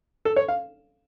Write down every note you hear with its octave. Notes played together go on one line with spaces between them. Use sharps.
A4
C#5
F5